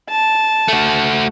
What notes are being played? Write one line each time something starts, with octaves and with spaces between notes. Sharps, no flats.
A5
A3 F#4